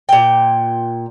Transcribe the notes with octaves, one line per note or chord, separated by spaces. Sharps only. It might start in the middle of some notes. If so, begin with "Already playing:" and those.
A#2 G5